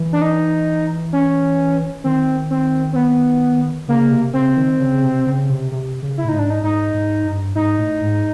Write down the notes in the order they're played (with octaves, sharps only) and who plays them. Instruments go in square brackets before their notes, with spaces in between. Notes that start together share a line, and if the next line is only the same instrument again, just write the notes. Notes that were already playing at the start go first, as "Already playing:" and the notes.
Already playing: [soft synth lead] E3
[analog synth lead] D4
D#4
C#4
[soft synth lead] D#3 [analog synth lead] C4
[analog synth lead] C4
C4
B3
[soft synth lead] C#3 [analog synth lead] A#3
[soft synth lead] C3
[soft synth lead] C#3 [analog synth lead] C4
[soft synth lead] D#3
C#3
C3
C#3
C3
C3
C#3
[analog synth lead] E4
[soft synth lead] A2
[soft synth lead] G#2 [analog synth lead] D#4
[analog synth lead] D4
D#4
[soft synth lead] G#2 [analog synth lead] D#4
[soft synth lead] G#2
G2
[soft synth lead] G#2 [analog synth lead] D#4
[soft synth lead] A2
G#2